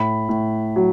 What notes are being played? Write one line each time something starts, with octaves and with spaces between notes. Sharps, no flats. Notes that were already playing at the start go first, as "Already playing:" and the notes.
Already playing: A2 B5
A2
F#3